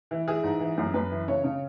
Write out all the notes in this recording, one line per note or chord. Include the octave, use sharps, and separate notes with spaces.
E3
E3 G#4
G#2
E3
F#2
F#2 B4
E3
C#3 C#5
C#3